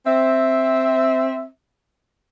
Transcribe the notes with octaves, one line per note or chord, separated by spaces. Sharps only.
C4 E5